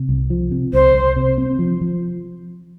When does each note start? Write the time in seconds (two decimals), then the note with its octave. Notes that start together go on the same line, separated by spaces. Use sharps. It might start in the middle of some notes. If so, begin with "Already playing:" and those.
Already playing: C3
0.09 C2
0.30 F3
0.51 C3
0.73 C2 C5
0.95 C2
1.16 C3
1.38 C4
1.59 F3
1.81 F3